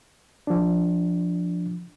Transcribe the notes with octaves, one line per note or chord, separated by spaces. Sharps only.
F3 D4